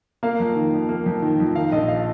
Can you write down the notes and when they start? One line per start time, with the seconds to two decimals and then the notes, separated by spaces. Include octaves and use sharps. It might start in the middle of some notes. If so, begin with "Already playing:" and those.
0.23 A#3 F5
0.40 F2
0.55 D#3
0.73 F2
0.89 A#3
1.06 F2
1.22 D#3
1.40 F2
1.56 D#3 F5
1.72 A#1 D#5
1.88 F5